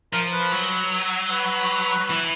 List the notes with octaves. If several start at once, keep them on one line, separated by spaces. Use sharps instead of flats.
F3 A#4
B4
F#3
B4
E3